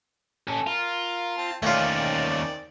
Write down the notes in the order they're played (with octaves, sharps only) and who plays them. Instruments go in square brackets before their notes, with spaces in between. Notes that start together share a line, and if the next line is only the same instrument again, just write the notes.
[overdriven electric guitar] C#4 A4
[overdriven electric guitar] F4 [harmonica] A#4
[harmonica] C4 A5
[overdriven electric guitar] D#2 C#4 [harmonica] D#3 C4 D5 [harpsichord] A3 F4